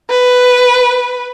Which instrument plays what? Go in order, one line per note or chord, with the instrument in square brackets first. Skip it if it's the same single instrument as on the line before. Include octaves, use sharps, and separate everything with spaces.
[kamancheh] B4